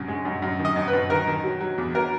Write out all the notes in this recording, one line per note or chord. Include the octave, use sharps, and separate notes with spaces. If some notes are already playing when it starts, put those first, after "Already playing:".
Already playing: F#2 C#3
G#3
F#2
F#2
D#3
D#5
F#2
B4
F#2
D#3 A#4
D#3
F#3
F#3
E2
F#3 A#4